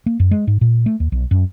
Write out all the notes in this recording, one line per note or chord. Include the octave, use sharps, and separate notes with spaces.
A#3
F#2
G#3
G#2
A#2
A3
D#2
B1
F#2